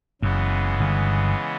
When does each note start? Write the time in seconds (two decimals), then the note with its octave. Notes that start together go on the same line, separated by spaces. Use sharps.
0.22 F#1 F#2 C#3 E3 G#3 B3
0.80 G1 G2